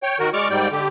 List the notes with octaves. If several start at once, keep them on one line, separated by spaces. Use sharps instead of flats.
C#5 G5
D#3 F#4 A#4
G#3 D5 C#6 D6 F6
G#2 G3 D5 G5
D3 G4